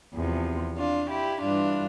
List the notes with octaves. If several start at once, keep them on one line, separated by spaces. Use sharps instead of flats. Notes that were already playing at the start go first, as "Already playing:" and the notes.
E2 C3 F3
D4 F4
E4 G4
G2 E3 D4 F4